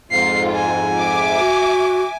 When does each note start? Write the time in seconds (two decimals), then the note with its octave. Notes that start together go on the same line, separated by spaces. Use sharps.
0.11 F2 G#2 F4 C7
0.55 G#5
0.99 E5 D6
1.38 F#4